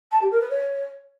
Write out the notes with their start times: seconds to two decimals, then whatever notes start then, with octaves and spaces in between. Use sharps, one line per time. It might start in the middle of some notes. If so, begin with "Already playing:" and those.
0.11 A5
0.21 G4
0.31 A#4
0.40 B4
0.50 C#5